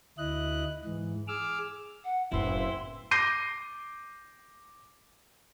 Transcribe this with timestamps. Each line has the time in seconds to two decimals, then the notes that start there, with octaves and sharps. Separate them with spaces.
0.18 D2 E4 D#5 F#6
0.85 G#2 E3
1.28 G#4 D6 E6 F6
2.04 F#5
2.32 F#1 A2 B3 C4 E4 C6
3.11 D6 G6 A#6 C7 D#7